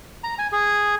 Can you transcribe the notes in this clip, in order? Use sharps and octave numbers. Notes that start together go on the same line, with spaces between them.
A#5
G#5
G#4